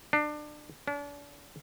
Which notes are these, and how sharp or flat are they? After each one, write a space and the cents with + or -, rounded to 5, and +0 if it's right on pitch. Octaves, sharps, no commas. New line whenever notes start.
D4 +25
D4 -40